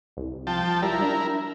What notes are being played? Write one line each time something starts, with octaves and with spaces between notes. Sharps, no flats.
C2
F3 G5 A5
G3 E4 A#4
D4